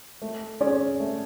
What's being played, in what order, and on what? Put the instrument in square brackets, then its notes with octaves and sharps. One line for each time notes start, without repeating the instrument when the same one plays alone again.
[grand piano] A3
C#4 G#4 D5
A3